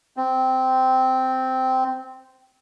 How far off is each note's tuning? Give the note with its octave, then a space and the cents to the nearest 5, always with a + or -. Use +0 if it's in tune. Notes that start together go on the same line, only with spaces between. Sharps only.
C4 -10